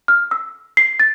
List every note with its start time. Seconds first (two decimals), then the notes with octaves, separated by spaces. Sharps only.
0.08 F6
0.31 E6
0.77 C7
1.00 A6